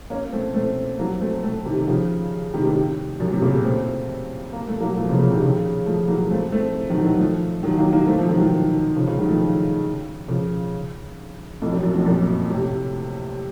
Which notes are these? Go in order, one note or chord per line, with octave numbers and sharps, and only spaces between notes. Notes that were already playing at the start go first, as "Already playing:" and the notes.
A#3 C#4
A3 C4
A3 C4
F#3 A#3
A3 C4
A3 C4
C3 D#3
C#3 F3
C3 D#3
A2 C3
F#2
A2 C3
A#2 C#3
A3 C4
A#3
A3
F#3 A#3
F3 A3
C#3 F3
A#2 C#3
C3 D#3
C#3 F3
F3 A3
F#3 A#3
A3 C4
A3 C4
D#3 F#3
D#3 F#3
F3 A3
D#3 F#3
F#3 A#3
F#3 A#3
A3 C4
F3 A3
D#3 F#3
D#3 F#3
C#3 F3
C#3 F3
D#3 F#3
F3 A3
C#3 F3
F2 A2
F#2
F#2
F2 A2
F#2 A#2
A2 C3